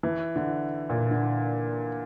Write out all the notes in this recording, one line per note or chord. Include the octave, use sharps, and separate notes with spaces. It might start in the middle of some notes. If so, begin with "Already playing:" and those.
E3
D3
A#2
D3